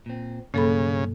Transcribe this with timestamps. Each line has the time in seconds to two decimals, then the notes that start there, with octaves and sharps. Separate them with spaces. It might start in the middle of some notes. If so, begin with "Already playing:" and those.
0.06 A#2 C4
0.54 B1 G2 C#3 A#3 A4 B5